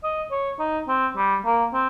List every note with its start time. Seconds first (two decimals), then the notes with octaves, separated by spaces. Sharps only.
0.03 D#5
0.31 C#5
0.59 D#4
0.88 C4
1.17 G3
1.45 A#3
1.74 C4